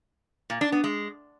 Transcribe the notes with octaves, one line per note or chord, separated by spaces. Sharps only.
A#2
D4
B3
G#3